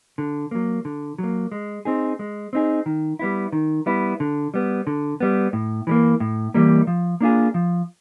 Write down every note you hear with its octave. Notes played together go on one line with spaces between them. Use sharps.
D3
F#3 A#3
D3
F#3 A#3
G#3
C4 D#4 G#4
G#3
C4 D#4 G#4
D#3
G3 B3 E4
D#3
G3 B3 E4
D3
G3 B3
D3
G3 B3
A2
E3 G3 A#3
A2
E3 G3 A#3
F3
A#3 D4 F4 G#4
F3